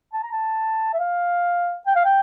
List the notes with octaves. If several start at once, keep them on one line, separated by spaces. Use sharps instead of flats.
A5
A#5
A5
E5
F5
G5
F5
G5